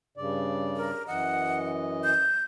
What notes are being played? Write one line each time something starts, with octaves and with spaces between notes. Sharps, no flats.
G2 C#3 D5
A#4
F#2 E3 D#5 F#5
G6